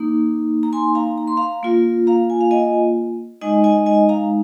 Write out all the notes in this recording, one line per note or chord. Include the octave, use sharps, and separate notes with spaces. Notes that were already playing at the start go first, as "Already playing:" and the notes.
Already playing: A#3 D#4
A#5
G#5 C6
F5 A#5
A#5
C6
F5 A#5
A#3 F4
F5 A#5
G#5
F5
D#5 G#5
G#3 D#4 D#5 G#5
D#5 G#5
D#5 G#5
F5 A#5